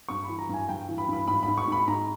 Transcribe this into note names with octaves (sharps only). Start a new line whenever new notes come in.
G2 C#6
B5
E3
A#5
G2 G#5
G2 G5
E3
B5
G2 B5
G#2 B5
G#2 B5
C#6
G#2 B5
G#2 A#5